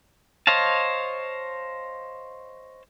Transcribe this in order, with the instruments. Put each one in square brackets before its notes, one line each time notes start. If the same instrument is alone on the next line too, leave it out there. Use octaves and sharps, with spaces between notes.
[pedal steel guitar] C5 C#5 D#5 F5 A5